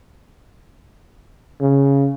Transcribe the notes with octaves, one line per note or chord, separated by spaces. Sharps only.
C#3